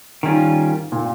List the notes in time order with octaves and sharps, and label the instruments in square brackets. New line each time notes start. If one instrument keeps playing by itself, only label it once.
[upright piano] G#2 [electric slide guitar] D#3 G3 C#4 F4
[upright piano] A#2